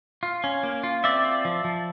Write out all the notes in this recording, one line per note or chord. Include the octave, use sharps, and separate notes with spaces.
F4
C#4
A#3
F4
C4 D5 E5
F4
F3
F3